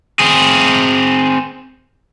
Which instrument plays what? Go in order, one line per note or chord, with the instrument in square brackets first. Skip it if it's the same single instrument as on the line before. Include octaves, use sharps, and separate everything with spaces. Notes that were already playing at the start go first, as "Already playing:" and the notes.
[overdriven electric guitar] C4 G#4